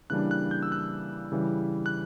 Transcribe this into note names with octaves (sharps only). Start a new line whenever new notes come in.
C#3 E3 G3 A#3 D4 F#6
F#6
G6
E6
F#6
C#3 E3 G3
F#6